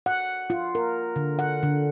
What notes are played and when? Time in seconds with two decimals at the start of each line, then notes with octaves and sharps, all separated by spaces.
0.06 F#5
0.50 F4
0.75 A#4
1.16 D3
1.39 F#5
1.63 D3